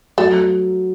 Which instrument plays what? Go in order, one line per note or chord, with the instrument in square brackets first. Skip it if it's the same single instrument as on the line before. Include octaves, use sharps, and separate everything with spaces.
[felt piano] F#3 [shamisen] A3